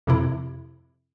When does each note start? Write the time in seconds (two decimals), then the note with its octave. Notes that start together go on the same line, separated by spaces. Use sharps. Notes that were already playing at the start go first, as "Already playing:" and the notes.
0.07 F2 C3 E4